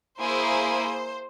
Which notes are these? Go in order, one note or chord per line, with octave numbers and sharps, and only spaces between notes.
A#3 E4 G#4 C5